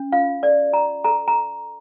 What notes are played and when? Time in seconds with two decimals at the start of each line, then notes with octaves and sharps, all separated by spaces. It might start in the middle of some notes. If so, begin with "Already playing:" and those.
Already playing: C#4
0.12 F4 F5
0.43 A4 D5
0.73 F4 A#5
1.04 A4 A#5
1.28 A#5